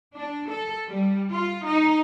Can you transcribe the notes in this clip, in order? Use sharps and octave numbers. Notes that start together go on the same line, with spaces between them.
D4
A4
G3
F4
D#4